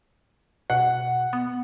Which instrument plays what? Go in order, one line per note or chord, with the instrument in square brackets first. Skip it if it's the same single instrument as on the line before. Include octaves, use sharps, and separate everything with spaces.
[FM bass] B2 [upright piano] F#5
[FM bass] B3